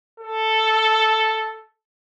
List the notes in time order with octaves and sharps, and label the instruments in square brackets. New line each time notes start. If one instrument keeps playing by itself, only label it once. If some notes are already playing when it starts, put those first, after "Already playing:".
[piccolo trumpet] A4